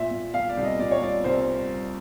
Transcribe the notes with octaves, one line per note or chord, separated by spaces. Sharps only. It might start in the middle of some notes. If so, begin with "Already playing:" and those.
Already playing: A#2 E5
A#2
A#2 F5
D5
C2
D#5
A#2 D5
C#5
A#2 D5
C2 C5